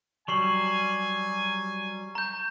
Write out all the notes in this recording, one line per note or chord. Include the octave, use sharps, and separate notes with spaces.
F#3 G3 G#5 C#6 C7 F#7
A#5 G6